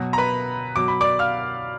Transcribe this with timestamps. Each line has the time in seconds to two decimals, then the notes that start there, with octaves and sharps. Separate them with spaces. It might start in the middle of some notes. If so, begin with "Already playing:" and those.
Already playing: B2 F#3
0.13 A#5
0.18 B4 B5
0.76 B2 F#3 D6
0.88 B5
1.01 D5 D6
1.19 F5 F6